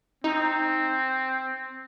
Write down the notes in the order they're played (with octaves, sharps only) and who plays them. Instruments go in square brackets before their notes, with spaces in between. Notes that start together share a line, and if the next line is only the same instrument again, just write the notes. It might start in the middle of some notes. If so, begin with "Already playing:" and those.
[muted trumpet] C4 [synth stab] D#4